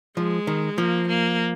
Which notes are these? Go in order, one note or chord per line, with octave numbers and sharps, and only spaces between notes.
F3 G#3
D#3
F3 A#3
A#3